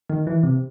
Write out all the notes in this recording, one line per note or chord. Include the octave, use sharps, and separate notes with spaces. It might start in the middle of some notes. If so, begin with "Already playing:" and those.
D#3
E3
C3